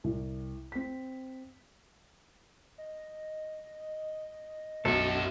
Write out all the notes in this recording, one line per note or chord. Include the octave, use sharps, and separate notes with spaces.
C2
C4 B6
D#5
B1 F#2 A4 E5